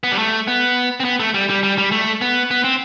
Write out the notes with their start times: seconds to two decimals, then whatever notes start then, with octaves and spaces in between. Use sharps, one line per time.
0.03 B3
0.11 G3
0.19 A3
0.47 B3
1.00 C4
1.05 B3
1.20 A3
1.34 G3
1.49 G3
1.63 G3
1.78 G3
1.92 A3
2.21 B3
2.51 B3
2.64 C4